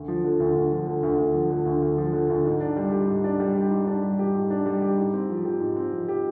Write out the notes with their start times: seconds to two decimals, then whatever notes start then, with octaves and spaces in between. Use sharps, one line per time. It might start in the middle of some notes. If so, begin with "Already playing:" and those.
Already playing: D2
0.08 F3
0.24 D3
0.40 D2
0.56 D2
0.72 F3
0.87 D3
1.03 D2
1.18 D2
1.34 F3
1.50 D3
1.66 D2
1.82 D2
1.98 F3
2.13 D3
2.29 D2
2.45 G#2
2.61 D4
2.76 G3
2.92 G4
3.08 G#2
3.24 D4
3.40 G3
3.55 G4
3.71 G#2
3.87 D4
4.03 G3
4.19 G4
4.35 G#2
4.50 D4
4.66 G3
4.82 G4
4.98 G#2
5.14 C4
5.30 F3
5.45 G4
5.60 G#2
5.77 C4
5.92 F3
6.08 G4